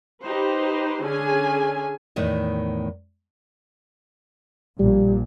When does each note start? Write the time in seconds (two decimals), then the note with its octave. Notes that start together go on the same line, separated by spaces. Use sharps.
0.24 D#4 G4 B4 C5
1.03 D3 C#4 G#4 G#5
2.16 E2 A2 D#3 D#5
4.79 A#1 A#2 G3